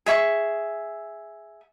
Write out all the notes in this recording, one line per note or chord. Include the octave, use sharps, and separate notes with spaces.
G#4 E5 C#6